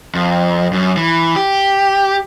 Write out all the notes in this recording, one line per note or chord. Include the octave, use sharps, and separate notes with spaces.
F2
F#2
E3
G4